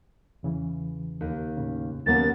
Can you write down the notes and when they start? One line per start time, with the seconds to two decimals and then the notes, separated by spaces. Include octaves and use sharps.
0.43 E2 C#3 E3
1.21 D#2
1.57 A2 C#3
2.06 D#2 G#3 A#3 B3 C#4 A6